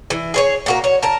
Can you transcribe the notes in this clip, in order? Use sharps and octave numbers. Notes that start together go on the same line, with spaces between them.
E3
G#4 C5 C#5
A#2 F#4 A#4
C#5
A#4 A5